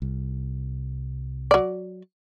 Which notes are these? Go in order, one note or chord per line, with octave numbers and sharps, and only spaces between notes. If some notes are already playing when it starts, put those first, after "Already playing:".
C2
F#3 D5